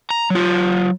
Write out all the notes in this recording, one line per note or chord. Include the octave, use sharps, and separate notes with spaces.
A#5
F#3 F4